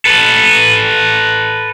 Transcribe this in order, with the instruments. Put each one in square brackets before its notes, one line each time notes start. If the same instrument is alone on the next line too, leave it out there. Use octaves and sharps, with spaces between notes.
[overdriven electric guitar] A4 B4